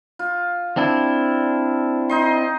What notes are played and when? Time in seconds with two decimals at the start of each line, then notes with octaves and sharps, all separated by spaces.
0.19 F4
0.77 C4 D4 E4
2.09 D#4 D#5 C6